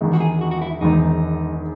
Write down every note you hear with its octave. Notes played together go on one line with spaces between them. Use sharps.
E1 E2 D#3 G#3
F#4
G#4
F#4
F#4
E4
E1 E2 D#3 G#3 D#4